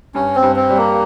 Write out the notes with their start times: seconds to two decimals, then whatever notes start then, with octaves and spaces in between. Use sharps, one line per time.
0.15 G2 C#4
0.35 C4
0.43 G2
0.56 C4
0.70 G3
0.77 A#3